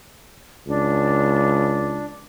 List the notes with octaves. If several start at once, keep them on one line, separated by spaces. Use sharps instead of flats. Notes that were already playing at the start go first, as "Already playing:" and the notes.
C#2 D4